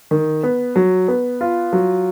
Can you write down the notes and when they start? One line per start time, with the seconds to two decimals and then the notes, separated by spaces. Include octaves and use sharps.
0.11 D#3
0.43 B3
0.76 F#3
1.08 B3
1.41 F4
1.73 F#3